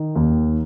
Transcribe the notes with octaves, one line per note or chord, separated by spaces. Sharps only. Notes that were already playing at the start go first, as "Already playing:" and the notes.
Already playing: D#3
D#2